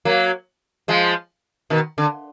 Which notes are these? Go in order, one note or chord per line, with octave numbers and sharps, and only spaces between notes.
F#3 A#3
F3 G#3
B2 D#3
D3